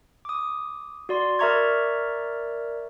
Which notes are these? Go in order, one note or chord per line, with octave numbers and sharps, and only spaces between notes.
D6 D#6
F#4 D5 C6
A#4 D5 E5 A#5 C#6 G#6